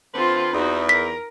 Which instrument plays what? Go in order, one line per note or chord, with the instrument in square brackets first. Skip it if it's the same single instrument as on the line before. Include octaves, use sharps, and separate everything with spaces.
[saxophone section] D3 B4 C5 [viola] C4 F4
[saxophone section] E2 [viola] D#4 F#4
[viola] A#4 [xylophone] B6